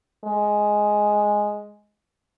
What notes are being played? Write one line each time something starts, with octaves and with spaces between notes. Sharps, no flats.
G#3